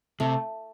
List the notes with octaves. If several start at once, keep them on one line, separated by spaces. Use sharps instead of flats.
C3 A3